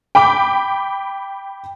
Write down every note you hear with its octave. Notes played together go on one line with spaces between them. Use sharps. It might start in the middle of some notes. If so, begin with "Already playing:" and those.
G5 B5 D6